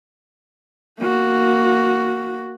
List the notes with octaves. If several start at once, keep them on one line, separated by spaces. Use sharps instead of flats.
A#3 F#4